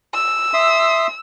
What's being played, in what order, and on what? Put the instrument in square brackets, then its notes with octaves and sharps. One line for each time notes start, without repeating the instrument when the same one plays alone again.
[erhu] E6
[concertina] E5 C6 D#6